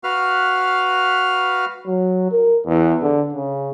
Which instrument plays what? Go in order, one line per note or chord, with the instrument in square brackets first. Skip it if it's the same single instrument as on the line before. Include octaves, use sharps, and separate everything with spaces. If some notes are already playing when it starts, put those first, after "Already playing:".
[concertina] F#4 B4 F5 F6
[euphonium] F#3
A#4
E2
D3
C#3